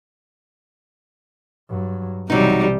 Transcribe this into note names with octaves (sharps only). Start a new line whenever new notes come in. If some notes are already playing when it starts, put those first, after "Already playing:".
G2 F#3
B1 C3 E3 F#3 G3 D#4